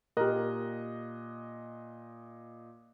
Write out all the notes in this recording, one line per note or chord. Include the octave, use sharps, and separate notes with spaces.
A#2 G4 A#4 D#5 F#6